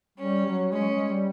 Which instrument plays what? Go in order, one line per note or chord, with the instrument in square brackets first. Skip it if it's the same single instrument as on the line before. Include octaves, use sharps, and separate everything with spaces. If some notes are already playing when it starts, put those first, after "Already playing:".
[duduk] G3 [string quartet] C#4
[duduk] F#3
[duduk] G#3 [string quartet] C#4
[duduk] G#3
G3